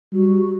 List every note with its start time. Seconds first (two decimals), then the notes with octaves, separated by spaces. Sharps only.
0.13 G3 F#4